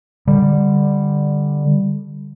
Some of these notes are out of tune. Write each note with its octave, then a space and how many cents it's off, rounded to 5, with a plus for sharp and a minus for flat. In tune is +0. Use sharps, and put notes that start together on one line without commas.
D3 +5 G3 +10